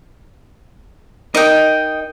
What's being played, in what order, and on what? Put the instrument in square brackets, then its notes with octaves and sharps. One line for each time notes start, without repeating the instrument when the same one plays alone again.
[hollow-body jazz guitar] D#4 A#4 [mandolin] D#5 G5